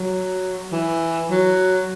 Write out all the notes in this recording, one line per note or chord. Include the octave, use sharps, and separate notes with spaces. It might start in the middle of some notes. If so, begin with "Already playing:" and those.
Already playing: F#3
E3
F#3